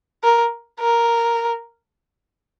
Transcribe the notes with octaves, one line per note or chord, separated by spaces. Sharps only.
A#4
A#4